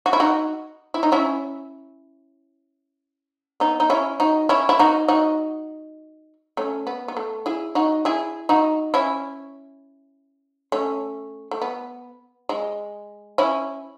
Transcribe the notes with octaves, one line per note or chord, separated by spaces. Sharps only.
F#4
E4
D#4 F#4
E4
D#4
C#4 E4
B3 D#4
D#4
C#4 E4
D#4 F#4
C#4 E4
E4
D#4 F#4
D#4 F#4
A3 C#4
B3
B3
A3
E4 G#4
D#4 F#4
E4 G#4
D#4 F#4
C#4 E4
A3 C#4
A3
B3
G#3
C#4 E4